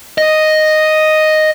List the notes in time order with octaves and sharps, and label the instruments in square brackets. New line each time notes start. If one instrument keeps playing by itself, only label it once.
[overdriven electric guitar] D#5